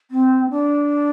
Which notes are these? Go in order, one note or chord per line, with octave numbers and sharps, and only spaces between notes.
C4
D4